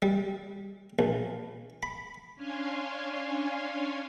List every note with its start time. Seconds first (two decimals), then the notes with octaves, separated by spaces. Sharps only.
0.02 G3
0.99 A#1
1.83 B5
2.35 C#4 D4 C#5 F5 G#5 C6